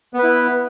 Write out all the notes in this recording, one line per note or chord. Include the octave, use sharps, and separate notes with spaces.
B3 E4 B4